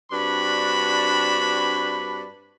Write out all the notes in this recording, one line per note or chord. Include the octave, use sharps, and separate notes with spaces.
G2 C4 D4 F#4 A5 B5